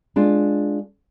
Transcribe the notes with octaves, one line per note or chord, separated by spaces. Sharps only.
G#3 D4 F4